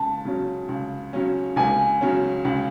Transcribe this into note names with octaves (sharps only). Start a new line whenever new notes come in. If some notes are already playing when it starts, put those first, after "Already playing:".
Already playing: C#2 A5
C#3 F#3 C#4
C#2
C#3 F#3 C#4
C#2 G#5
C#3 F#3 C#4
C#2